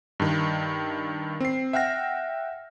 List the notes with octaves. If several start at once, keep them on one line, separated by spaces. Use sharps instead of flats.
G2 D#3
C4 C7
E5 F#5 G5 F6 A#6